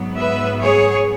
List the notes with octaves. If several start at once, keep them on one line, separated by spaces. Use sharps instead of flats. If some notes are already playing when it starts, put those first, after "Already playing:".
Already playing: G#2 F#3 B3
B4 E5
G#4 C#5